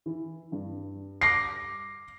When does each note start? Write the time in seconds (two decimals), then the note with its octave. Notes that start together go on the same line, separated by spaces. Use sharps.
0.06 E3
0.52 G2
1.21 D6 A#6 C7